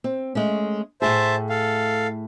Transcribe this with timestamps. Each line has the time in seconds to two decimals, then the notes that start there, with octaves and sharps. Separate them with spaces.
0.04 C4
0.35 G#3 A3 C#4
1.02 A2 A3 G#4 C5 E5 A5
1.49 A4 F5